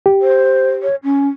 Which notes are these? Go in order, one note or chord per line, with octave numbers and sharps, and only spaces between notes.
G4
C5
C#5
C#4